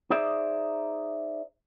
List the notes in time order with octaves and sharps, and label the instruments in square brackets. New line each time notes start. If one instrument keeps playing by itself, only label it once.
[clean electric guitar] D#4 G#4 C5 D5 E5